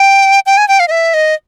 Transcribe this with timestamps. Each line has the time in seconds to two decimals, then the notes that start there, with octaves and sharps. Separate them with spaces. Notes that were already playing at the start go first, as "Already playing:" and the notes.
Already playing: G5
0.46 G5
0.57 G#5
0.68 G5
0.80 F5
0.88 D#5
0.91 E5
1.14 D#5